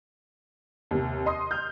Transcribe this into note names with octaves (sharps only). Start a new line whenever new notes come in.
D#2 C3
D#5 C6 D#6
F6 G6